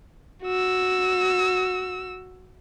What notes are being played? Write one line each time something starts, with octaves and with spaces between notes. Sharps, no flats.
F#4 E6